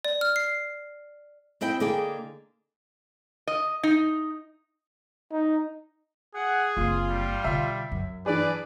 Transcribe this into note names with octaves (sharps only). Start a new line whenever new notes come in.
D5
F6
C7
C4 E4 D#5 G5
D3 A#3 G#4 D#5 G5
D#5
D#4
D#4
G#4 F#5
F#1 C4 F4
G3
B2 D3 E5
F#2
E3 D4 G#4 B4 D5